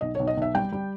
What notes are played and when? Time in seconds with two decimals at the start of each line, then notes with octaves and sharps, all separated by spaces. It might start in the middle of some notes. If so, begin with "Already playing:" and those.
0.01 B1 D#5
0.15 C#5
0.19 B1
0.27 D#5
0.37 B1 E5
0.54 G3 G5
0.72 G3